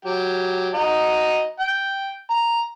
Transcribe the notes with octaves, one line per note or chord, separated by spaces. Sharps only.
F#3 G4
F#4 D#5 A#5
G5
A#5